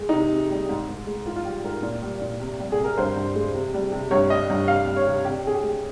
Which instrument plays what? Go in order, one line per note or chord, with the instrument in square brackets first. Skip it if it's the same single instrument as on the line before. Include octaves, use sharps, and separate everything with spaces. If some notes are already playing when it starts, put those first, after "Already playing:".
Already playing: [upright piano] G#3
C3 D#4
C3
G3
G#2
G#2
G#3
G#2 F4
F4
G3 G4
G#2 A#4
A#2
G3
A#2
C3
G3
G#4
C3
A#4
G2 C5
G2
G#3
C3
G3
C3
G2 C#5
G3 D#5
G2
C3 F5
G3
C#5
C3
C3 G4
C3 G#4
G4
G#3